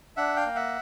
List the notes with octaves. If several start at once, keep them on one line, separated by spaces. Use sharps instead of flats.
D4 E5 F#5
F5 G5
A#3
E5 F#5